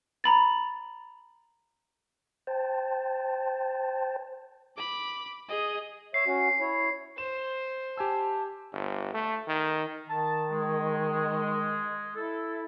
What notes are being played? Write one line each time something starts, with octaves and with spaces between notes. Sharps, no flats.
A#5 B5 A6
C5 G5 A5
B5 D6
G#4 D#5
C#5 E5 C7
C#4 F#4
E4 C#5
C5 E7
G4 G#5 A5 E6
G1
A3
D#3
D#3 A5
G#3
E4 A4